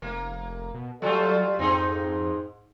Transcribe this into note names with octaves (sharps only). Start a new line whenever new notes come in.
F1 A#3
B2
F#3 G3 A3 F4 A4
F2 G#2 C4 D#4 G#4